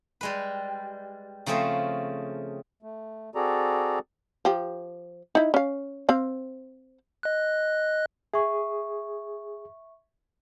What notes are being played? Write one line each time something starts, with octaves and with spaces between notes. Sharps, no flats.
G3 G#3 B4
C#3 F3 A3 C4 G#4
A3
C4 F#4 G#4 A4 D5 A#5
F3 G4
D#4 E4
C#4 F5
C4 F5
D#5 F#6
G#4 E5 C#6